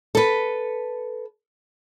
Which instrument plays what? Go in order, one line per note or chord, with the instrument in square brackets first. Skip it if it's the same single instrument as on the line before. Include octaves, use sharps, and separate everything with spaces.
[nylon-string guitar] A4 B4